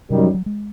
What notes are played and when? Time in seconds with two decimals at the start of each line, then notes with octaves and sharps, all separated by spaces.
0.10 F#2 C3 D#3 G3
0.22 F3
0.34 F#3
0.46 G#3